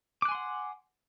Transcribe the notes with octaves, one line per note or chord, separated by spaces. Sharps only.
F#5 G#5 C6 D6 F#6